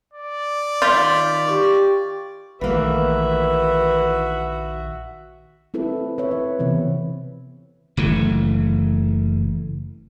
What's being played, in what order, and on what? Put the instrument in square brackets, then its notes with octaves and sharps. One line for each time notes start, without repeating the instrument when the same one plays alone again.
[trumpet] D5
[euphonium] D#3 [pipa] F4 [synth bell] G6 A6 B6
[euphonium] G4 [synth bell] C#6
[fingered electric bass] A#1 D#3 A3 [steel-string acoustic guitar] E3 A#3 [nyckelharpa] F#4 E5 [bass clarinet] B4
[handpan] C4 E4 A4 B4
B4 C#5 E5
B4
C3 E3 B3 C4
[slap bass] F#1 E3 A3